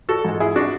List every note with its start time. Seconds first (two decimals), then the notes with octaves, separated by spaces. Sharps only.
0.09 F#4 A4
0.25 G#2 G#3
0.40 E4 G#4
0.56 D4 F#4